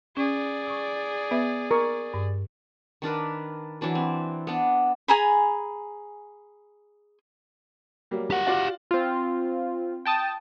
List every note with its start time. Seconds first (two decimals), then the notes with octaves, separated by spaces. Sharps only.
0.17 C#4 G#4 D5
0.67 C#6 D#6
1.31 B3 B4 E5
1.71 A#4 C#6
2.14 G2
3.02 D#3 D4 A#4 B4
3.81 E3 F#3 D4 B4
3.95 C4
4.47 B3 D4
5.08 G#4 G#5 A#5 B5
8.11 F#3 G3 A#3
8.30 G4 F#5
8.47 F4 F#4 D5
8.91 C4 F4
10.05 G5 A5 D#6